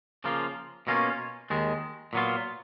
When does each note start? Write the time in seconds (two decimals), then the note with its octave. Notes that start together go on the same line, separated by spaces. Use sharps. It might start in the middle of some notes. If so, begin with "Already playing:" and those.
0.24 C#3 F3 A#3 F4
0.87 B2 A#3 C#4 F4
1.50 D#2 D#3 G#3
2.13 A#2 F#3 B3 F4